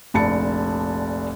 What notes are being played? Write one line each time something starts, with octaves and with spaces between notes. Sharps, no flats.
F1 A#1 A5 B5 C#7